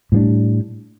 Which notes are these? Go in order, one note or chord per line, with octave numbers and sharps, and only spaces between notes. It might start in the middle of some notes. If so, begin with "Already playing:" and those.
A2 G3 A#3 D4